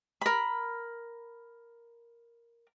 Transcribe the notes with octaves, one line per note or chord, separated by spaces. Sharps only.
A#4 B5